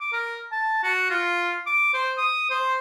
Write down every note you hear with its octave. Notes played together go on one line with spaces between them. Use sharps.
D6
A#4
A5
F#4
F4
D6
C5
D#6
C5